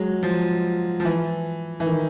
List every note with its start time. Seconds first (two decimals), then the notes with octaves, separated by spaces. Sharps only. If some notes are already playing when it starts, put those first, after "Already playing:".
Already playing: F#3 G#3
0.23 F3
1.00 F3
1.05 E3
1.80 E3
1.86 D#3